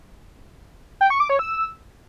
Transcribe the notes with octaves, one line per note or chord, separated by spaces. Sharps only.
G5
C#6
D6
C#5
E6